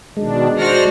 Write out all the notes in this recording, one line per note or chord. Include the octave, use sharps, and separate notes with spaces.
B2 D#3 G#3 D4
D4 F#4 C5 F6 A#6